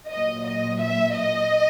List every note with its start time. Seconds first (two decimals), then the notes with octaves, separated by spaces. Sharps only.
0.10 A#2 F#3 D#5
0.46 D#5
0.82 E5
1.18 D#5